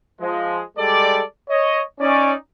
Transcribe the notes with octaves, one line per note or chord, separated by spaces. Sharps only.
F3 G#3
G3 G#3 A4 D5
C#5 D#5
C#4 D#4 D5